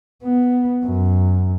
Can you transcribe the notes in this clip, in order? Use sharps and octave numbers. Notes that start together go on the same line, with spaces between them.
B3
F#2